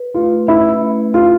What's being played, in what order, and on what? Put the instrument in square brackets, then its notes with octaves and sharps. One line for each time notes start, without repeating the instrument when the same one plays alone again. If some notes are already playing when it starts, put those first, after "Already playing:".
Already playing: [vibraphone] B4
[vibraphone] A3 [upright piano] F4
[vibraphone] C#4 [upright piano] E4
[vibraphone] A3
[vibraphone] E4 [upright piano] F4